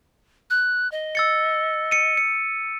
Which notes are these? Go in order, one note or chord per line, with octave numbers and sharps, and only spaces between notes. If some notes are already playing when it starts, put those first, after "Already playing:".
F#6
D#5
E6 A6 C#7
C#7 D#7
C#7